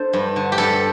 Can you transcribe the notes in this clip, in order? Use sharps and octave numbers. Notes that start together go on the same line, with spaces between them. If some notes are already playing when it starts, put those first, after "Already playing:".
Already playing: D4 A4 C5
G2
D3
G4
G2 A4